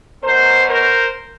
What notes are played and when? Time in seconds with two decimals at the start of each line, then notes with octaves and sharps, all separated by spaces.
0.23 E2 B2 F#3 A#4 C5
0.68 A#4 C5